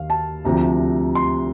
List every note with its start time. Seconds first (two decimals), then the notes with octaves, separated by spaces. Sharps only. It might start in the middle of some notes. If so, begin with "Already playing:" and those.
Already playing: D#2 D#3 F5
0.10 A5
0.45 D2 C3 F3 A#5
1.15 C6